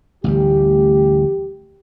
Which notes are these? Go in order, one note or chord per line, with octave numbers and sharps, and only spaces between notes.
A1 D2 G3 G4